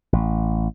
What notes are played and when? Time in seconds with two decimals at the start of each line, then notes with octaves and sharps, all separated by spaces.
0.13 A1